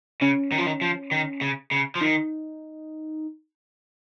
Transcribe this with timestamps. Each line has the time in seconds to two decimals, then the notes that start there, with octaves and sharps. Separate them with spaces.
0.21 C#3 C#4
0.52 D#3
0.58 F3
0.66 D#3
0.81 F3
1.11 D#3
1.41 C#3
1.71 C#3
1.95 F3
2.01 D#3 D#4